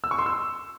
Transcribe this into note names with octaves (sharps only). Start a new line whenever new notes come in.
E6
C#6
C6
E6